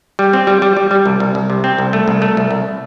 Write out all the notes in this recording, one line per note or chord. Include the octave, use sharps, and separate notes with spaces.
G3
C4
G3
G3
G3
G3
C2
C2
C2
C3
C4
C2
A3
C2
A3
C2
C2